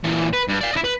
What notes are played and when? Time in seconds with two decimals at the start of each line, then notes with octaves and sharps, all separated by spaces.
0.04 A#2 E3
0.33 B4
0.48 G2
0.60 D5 F5
0.73 E4 D#5
0.84 B4